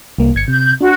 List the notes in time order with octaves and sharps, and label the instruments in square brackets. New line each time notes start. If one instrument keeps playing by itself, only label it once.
[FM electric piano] C2 A#3
G1 G#6 C#7
[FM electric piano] C3 [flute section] G6
[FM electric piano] D4 [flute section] F#4